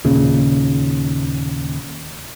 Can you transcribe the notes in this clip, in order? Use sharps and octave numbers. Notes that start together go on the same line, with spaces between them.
D#2 A#2 C#3